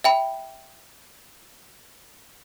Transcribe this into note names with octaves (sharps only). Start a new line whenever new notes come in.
E5 G5 B5